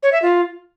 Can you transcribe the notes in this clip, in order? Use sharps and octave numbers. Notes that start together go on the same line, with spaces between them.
C#5
E5
F4